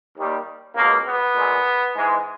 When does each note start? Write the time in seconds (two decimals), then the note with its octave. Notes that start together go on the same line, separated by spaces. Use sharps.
0.16 D#2 D#3 G3 A#3
0.76 C#2 B2 G#3 A#3
1.06 B3
1.35 A#2 G#3
1.95 G#2 E3 G#3